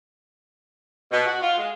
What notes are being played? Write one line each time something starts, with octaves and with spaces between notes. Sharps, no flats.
B2
F#4
F4
G#3